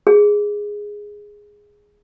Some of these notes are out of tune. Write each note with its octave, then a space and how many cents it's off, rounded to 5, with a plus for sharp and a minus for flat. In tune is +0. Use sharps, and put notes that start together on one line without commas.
G#4 -5